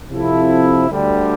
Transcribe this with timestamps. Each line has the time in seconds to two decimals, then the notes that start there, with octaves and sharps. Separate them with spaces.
0.11 C3 F3 C4 E4 A4
0.89 D2 D3 G3